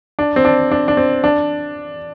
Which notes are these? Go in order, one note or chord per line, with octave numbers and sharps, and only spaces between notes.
D4
C4
D4
D4
D4
C4
D4